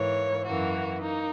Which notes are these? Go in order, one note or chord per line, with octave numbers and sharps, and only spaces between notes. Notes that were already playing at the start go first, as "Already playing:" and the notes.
Already playing: G#2 E3 A#3 C#5
F#2 E3 A#3 F#4
A#3 D#4